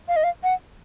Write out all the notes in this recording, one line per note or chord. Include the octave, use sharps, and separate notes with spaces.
F5
D#5
F5
F#5